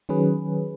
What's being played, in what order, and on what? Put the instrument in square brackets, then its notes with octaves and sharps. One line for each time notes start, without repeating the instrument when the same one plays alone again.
[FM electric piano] D#3 F#3 C#4 G#4 B4